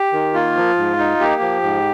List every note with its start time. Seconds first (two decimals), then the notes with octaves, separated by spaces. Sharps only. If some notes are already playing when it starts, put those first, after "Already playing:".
Already playing: G4
0.13 D#3
0.34 A#3 F4
0.56 F3
0.77 G#2
0.98 D#4
1.20 A#3 G4
1.41 F3
1.63 G#2